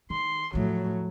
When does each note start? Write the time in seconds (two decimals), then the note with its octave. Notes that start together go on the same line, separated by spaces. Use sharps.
0.10 D#3 C6
0.53 E2 A2 F3 F#3